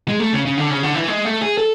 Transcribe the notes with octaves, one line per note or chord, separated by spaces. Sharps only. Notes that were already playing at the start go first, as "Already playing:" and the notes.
G#3
A3
C#3
C#3
D3
C#3
D3
E3
G#3
A3
G#4
A4